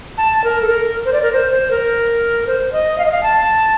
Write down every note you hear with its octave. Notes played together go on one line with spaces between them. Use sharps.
A5
A#4
A4
A#4
C5
D5
A#4
C5
C5
A#4
C5
D#5
F5
D#5
F5
A5